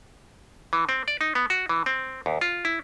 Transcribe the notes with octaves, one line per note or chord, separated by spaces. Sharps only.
E3
C4
D5
D#4
B3
F#4
E3
C4
D#2
F4
E4